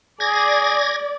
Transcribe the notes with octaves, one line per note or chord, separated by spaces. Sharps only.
G#4 D5 G#6 A#6